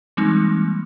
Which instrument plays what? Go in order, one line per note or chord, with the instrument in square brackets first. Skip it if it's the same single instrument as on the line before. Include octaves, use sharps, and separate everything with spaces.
[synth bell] E3 G3 G#3 A#3 C4 D#4